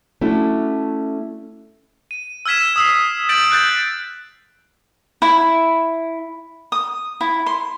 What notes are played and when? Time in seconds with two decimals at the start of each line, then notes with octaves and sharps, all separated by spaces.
0.21 A3 C#4 D4 E4 F#4
2.11 D#7
2.46 E6 F6 G#6 B6 E7
2.76 D#6 E6 C7
3.29 G6 A6 B6 D7 F#7
3.52 F#6 G6 A6
5.22 E4
6.72 D#6
7.21 E4
7.46 C6